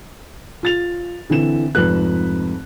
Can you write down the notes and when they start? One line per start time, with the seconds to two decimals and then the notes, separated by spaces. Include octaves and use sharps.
0.63 F4 A6 F7
1.30 D3 E3 C4 E7
1.75 F1 F2 G#2 B4 F#6